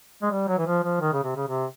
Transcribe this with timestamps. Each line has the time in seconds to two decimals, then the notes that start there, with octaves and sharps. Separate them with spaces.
0.22 G#3
0.31 G3
0.48 F#3
0.58 E3
0.66 F3
0.83 F3
1.00 D#3
1.13 C#3
1.23 C3
1.36 C#3
1.47 C3